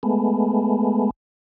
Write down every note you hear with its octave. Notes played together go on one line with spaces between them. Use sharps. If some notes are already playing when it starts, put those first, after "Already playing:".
G#3 A3 B3